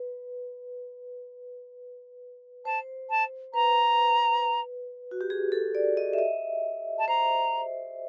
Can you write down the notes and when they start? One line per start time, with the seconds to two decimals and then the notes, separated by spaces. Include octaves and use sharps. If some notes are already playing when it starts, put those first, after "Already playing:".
Already playing: B4
2.65 C5 A5
3.09 A5
3.54 B4 A#5
5.11 F#4
5.21 G4
5.30 G#4
5.52 A4
5.75 D5
5.97 D#5
6.13 E5
6.18 D#5
6.98 A5
7.08 C5 A#5